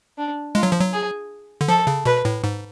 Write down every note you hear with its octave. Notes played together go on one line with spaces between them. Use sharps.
D4
G#3 F4
F#3
F3
F#3
G#4
D3
F3 A4
C#3
B2 B4
A2
G#2